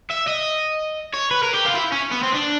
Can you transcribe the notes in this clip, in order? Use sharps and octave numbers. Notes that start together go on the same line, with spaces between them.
E5
D#5
C#5
B4
A#4
G4
F4
E4
C#4
B3
C4
D4